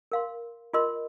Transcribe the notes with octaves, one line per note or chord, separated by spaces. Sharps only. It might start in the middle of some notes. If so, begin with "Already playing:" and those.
A#4 F5 C6
F4 A#4 D#5 C6